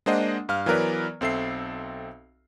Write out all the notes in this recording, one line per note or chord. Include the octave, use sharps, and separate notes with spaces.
G#3 A#3 D4 C5 D#5 F#5
G2 F5 F6
E3 F#3 B3 A#4 B4 D5
B1 C4 A4 E5 C7